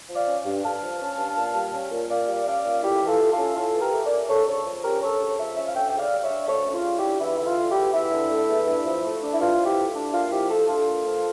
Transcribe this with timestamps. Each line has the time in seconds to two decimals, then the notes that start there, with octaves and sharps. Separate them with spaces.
0.09 F3
0.15 D5 F5
0.27 C#4
0.45 G2
0.63 G2 F5 A5
0.82 F3
1.00 C#4
1.18 G2
1.36 A#2
1.54 G3
1.73 C#4
1.91 A#2
2.09 A#2 D5 F5
2.28 G3
2.46 C#4 D5 F5
2.65 A#2
2.83 A2 E4 G4
3.01 E3
3.07 F4 A4
3.19 A3
3.31 F4 A4
3.37 C#4
3.55 A2 F4 A4
3.74 E3
3.80 G4 A#4
3.92 A3
4.04 A#4 D5
4.11 C#4
4.28 D2 A4 C#5
4.47 C#3 A4 C#5
4.65 F3
4.83 C#4 G4 A#4
5.02 D2 A4 C#5
5.20 C#3
5.38 F3 C#5 E5
5.55 C#4 E5
5.65 F5
5.75 D2 E5 G5
5.90 C#3 G5
5.99 D5 F5
6.12 G3
6.19 F5
6.24 C#5 E5
6.30 D4
6.47 D2 A4 C#5
6.66 C#3
6.73 F4
6.84 G3
6.97 E4 G4
7.03 D4
7.21 E2 E4
7.38 D3 E4
7.45 F4
7.57 A3
7.69 E4 G4
7.76 E2
7.94 E2 E4
8.12 D3
8.31 A3
8.49 E2
8.67 G2
8.85 F3
9.04 A3
9.22 D4
9.33 E4
9.40 G2 F4
9.58 F3
9.64 E4 G4
9.77 A3
9.95 D4
10.13 A#2 F4
10.31 F3 E4 G4
10.49 A3 F4 A4
10.68 D4 F4 A4
10.86 A#2
11.04 F3